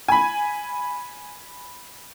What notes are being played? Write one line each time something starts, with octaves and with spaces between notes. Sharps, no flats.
G#5 B5